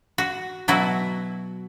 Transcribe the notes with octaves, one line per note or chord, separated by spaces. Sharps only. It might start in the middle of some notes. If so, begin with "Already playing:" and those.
F#4
B2 F#3 E4 F#4